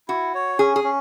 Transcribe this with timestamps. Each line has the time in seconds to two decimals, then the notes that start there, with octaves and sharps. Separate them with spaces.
0.08 E4 F#4
0.34 C#5
0.59 C#4 G#4
0.76 G#4
0.84 C#4